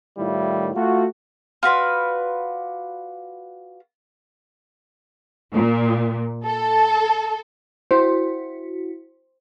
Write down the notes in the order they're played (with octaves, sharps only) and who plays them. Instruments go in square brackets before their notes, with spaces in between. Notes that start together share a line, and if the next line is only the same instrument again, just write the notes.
[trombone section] A2 D#3 G3 E4 F4
A3 F4 F#4
[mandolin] F4 F#4 B4 D5
[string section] A#2
A4
[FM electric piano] E4 F#4 [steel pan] C5